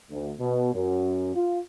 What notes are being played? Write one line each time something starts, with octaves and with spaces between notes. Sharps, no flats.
D2
B2
F#2
F4